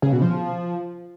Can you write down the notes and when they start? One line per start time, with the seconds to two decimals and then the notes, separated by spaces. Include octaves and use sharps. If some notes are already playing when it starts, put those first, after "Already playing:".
0.02 C#3
0.12 B2
0.22 F3